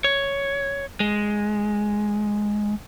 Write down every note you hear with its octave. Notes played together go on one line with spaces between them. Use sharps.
C#5
G#3